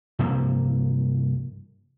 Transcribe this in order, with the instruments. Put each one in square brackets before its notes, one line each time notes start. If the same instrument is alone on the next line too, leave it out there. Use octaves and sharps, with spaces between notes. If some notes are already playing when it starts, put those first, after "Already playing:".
[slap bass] G2 C3 F3 A#3